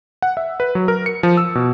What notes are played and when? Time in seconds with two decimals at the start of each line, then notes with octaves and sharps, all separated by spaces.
0.22 F#5
0.37 E5
0.60 B4
0.75 F#3
0.88 A#4
1.06 C#7
1.23 F3
1.37 E6
1.55 B2